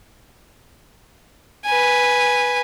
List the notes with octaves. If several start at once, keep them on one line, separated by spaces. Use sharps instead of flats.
B4 G#5